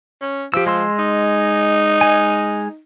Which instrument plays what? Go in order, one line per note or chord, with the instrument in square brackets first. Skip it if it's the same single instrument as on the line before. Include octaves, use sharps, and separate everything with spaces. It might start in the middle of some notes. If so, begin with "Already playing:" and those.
[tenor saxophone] C#4
[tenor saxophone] F3 [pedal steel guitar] G4 E6
[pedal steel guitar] G#3 C6 E6
[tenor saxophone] D#4
[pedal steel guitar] G#3 G#5